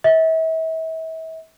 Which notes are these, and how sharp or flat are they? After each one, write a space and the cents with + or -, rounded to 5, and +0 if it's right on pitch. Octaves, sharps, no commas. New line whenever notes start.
E5 -35